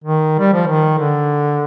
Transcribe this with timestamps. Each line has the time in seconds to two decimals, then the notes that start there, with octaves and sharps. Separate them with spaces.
0.04 D#3
0.39 G3
0.53 F3
0.67 D#3
0.98 D3